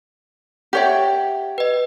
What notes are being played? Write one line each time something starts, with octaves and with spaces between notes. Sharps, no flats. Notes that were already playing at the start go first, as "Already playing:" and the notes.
G4 C#5 E5 F#5 G5
B4 D#5